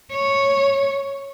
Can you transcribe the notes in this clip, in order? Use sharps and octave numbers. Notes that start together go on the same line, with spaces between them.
C#5